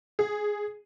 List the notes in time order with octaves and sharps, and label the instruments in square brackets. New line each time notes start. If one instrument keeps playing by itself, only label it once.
[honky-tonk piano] G#4